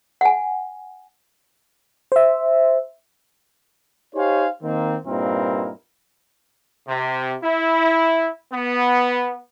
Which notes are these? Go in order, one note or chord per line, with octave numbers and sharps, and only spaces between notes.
F#5 G#5
C5 E5
D#4 G4 C5 C#5 F5 G#5
D#3 A#3 C4
G2 A#2 C4 D#4 E4 A#4
C3
E4
B3